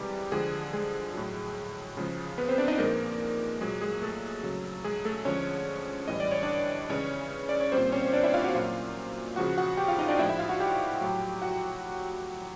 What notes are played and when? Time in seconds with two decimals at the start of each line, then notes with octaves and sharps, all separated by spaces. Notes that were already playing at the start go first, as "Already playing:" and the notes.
Already playing: C3 E3 G3 G#3 G4
0.32 D3 F3 G#3 G#4
0.73 G#3 G#4
1.14 A2 F#3
1.97 C#3 F3 G#3
2.38 B3 B4
2.48 C4 C5
2.58 D4 D5
2.68 D#4 D#5
2.78 A#2 F3 G#3 A#3 A#4
3.61 A#2 F#3 G#3 G#4
3.81 G#3 G#4
4.02 A3 A4
4.43 C#3 F#3
4.84 G#3 G#4
5.05 A3 A4
5.25 D3 F3 G#3 C#4 C#5
6.08 A2 E3 G3 D#5
6.20 D5
6.31 C#5
6.43 D4 D5
6.90 C#3 E3 G#3 C#4 C#5
7.49 D5
7.60 C#5
7.72 A#2 G3 C4 C5
7.92 C#4 C#5
8.13 D4 D5
8.24 E4 E5
8.34 F4 F5
8.44 F#4 F#5
8.54 A#2 F#3 F4 F5
9.36 C#3 F3 G#3 F#4 F#5
9.58 F#4 F#5
9.77 G4 G5
9.88 F4 F5
9.98 D#4 D#5
10.08 D4 D5
10.19 A2 F3 G#3 E4 E5
10.29 E4 E5
10.39 F4 F5
10.49 F#4 F#5
10.60 G4 G5
11.01 A2 F#3
11.42 F#4 F#5